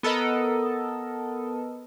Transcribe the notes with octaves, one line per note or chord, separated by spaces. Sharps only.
B3 A4 A#4 D#5